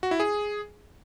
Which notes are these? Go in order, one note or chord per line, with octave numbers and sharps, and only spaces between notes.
F#4
E4
G#4